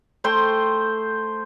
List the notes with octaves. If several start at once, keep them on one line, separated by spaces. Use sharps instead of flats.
A3 C5 G5 C6